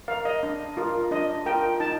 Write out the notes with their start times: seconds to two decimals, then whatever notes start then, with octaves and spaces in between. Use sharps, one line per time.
0.08 A#4 F5
0.25 D#5
0.43 D4
0.77 F4 A#4
1.11 D4 D#5
1.46 F4 A#4 G5
1.80 D#4 A5